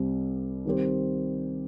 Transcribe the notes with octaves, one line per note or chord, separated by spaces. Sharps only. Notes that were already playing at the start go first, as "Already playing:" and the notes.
Already playing: C2 C3 G3 C4
D#3 G3 C4 G4 C5